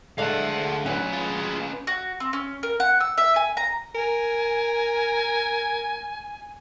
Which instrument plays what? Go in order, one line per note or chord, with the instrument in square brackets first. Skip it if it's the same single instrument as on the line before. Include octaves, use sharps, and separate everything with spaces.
[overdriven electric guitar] D2 F#5 [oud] D3 G#3 A3 [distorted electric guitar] F5 A5
[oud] F#3 [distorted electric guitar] C#4 B4
[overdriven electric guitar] G#3 F4
[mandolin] F#4
C4
C#4
A#4
F#5
E6
E5
G#5
A#5
[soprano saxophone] A#4 [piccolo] G#5